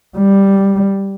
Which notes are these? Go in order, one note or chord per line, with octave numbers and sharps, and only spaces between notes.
G3